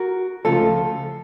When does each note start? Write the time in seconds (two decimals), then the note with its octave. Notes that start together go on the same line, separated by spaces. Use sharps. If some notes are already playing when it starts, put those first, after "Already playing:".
Already playing: F#4 A#4
0.45 C#2 C#3 F3 A3 F4 A4